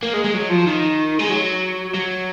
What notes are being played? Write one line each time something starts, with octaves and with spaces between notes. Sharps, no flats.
A#3
G#3
G#3
F#3
F3
D#3
G#3
F#3
F#3